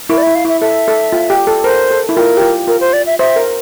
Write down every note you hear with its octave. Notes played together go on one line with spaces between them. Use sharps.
E4 A#4
D5
E5
E4
F5
E4 E5
A4 E5
A4
F4
G4
A4
A#4 C5
A4
E4
F4 A#4
G4
F4
F4 A#4
C5
D5
E5
C5 E5
A#4